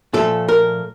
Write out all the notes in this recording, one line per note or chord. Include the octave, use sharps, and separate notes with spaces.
A#2 F3 A3 A4
A#4